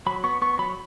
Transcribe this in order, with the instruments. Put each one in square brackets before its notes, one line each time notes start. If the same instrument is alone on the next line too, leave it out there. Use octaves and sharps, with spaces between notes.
[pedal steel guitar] F#3 B5
B3 C#6
B3 C#6
F#3 B5